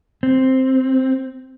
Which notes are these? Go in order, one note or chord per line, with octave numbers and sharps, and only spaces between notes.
C4